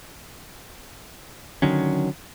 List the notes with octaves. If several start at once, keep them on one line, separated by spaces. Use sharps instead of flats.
D3 D#3 F#3 C#4